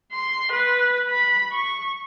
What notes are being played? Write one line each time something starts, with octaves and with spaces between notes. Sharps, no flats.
C6
B4
B5
C#6